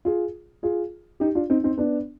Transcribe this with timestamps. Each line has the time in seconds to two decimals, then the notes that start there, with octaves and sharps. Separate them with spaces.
0.05 F4 G#4
0.63 F4 G#4
1.20 D#4 G4
1.35 D4 F4
1.50 C4 D#4
1.64 C4 D#4
1.78 B3 D4